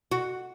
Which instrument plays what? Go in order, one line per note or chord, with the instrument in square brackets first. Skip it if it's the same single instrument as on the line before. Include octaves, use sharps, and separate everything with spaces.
[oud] F#4